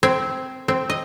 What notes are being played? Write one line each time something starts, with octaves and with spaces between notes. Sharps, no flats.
C4
C4
D#5